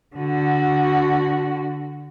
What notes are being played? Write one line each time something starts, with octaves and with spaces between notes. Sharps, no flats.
D3 F#4